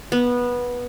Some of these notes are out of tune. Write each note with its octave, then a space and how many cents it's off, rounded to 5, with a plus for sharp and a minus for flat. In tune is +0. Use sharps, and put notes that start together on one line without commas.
B3 -15